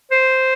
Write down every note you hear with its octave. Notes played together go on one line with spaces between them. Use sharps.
C5